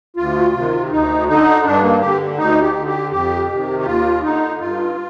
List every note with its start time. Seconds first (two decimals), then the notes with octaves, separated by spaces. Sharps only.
0.16 D2 F4
0.53 C3
0.58 D#3
0.91 D2 D#4
1.28 D3 D#4
1.65 G2 D4
1.83 A#3
2.01 D3 G4
2.38 D2 D#4
2.62 G4
2.75 D3
2.87 G4
3.11 F2 G4
3.49 C3 D#3
3.80 G4
3.85 D#2 F4
4.22 D3 D#4
4.60 G2 F4